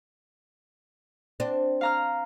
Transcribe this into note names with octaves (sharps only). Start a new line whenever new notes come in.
C4 D4
F5 A#5 F6